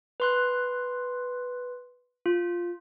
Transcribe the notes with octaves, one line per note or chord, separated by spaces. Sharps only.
B4 C6 F#6
F4